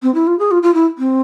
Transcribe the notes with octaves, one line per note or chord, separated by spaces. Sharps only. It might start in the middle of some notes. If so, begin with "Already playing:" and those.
C4
E4
F4
G#4
F4
F4
E4
C4